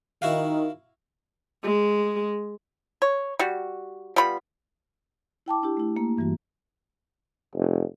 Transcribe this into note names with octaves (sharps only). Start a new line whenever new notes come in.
D#3 E4 F#4 F5
G#3
C#5
G3 F#4
G3 B3 F4 B5
E4 G5 A5 D6
D4 E4 G4
A3 E4
A#3
G2 E3 G3 F#4
F1